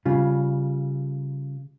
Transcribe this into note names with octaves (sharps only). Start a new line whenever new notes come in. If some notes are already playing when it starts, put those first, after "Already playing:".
C#3 G3 F4